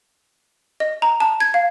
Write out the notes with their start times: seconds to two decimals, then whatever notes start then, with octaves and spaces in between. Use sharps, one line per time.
0.80 D#5
1.02 A#5
1.20 A5
1.40 G#6
1.54 F5